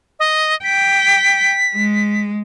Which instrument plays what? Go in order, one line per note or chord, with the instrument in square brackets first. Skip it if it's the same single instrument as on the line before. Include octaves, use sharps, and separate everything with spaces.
[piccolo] D#5
[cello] G5 [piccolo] B6
[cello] G#3